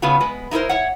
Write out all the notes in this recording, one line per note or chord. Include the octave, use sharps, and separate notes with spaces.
C#3 A3 B3 C#4 F4 F#4
G#3 B3 B4
D#4 E4 G#4 A#4 C5
C#5 E5 F#5